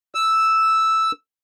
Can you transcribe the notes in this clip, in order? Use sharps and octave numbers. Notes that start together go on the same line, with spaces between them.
E6